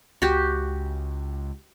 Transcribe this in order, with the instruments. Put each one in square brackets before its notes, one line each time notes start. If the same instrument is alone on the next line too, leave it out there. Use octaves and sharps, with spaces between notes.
[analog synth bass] C#2 [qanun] F#4 G4